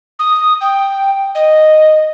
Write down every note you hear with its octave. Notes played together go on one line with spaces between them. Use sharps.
D#6
G5
D#5